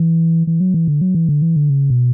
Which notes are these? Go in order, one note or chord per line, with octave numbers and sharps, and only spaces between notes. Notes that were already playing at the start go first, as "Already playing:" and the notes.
Already playing: E3
E3
F#3
E3
D3
F#3
E3
D3
E3
D3
C#3
B2